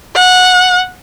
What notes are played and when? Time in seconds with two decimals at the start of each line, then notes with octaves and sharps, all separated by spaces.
0.15 F#5